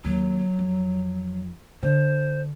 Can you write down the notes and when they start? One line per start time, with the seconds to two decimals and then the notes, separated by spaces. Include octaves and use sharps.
0.04 D#2 F#3
0.59 F2
1.83 D3 C5